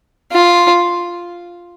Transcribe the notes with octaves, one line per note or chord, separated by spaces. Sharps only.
F4